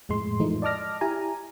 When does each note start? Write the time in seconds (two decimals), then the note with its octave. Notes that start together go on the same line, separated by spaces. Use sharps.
0.09 F2 A2 G#3 C6
0.40 E3 F3 G#3 A3 D#4
0.62 D5 D#5 A5 D6 F6 A#6
1.01 E4 G4 G#5 A#5